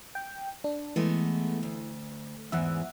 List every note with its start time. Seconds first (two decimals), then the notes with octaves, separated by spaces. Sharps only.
0.15 G5
0.64 D4
0.96 E3 G#3 A3 B3
1.63 D2
2.52 E2 G#2 E3 E5 F#5